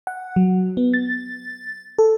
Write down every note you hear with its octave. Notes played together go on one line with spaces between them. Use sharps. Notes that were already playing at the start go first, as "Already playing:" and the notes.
F#5
F#3
B3
A6
A4